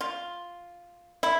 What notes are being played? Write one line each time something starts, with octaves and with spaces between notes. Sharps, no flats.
F4
E4